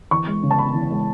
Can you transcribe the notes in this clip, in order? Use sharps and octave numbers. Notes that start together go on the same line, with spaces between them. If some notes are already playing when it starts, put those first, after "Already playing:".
E3 C#6
G#3
C#3
A5
B3 B5
E3
G#3